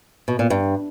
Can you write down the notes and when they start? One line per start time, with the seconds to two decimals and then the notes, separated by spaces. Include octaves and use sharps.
0.28 B2
0.39 A#2
0.50 G2